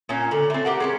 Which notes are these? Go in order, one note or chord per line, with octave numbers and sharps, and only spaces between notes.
A#2 C#4
D3
A3 C4
G4 A#4 F#5
G#3 A#3 C#4